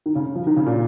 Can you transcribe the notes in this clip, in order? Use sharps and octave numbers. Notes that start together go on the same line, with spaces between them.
D#3
C#3
F3
D#3
C#3
A#2